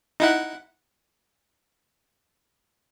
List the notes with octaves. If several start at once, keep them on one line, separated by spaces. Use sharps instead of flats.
D#4 E4 F#5